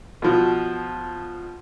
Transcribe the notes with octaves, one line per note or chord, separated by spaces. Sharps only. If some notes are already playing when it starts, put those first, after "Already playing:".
B2 F3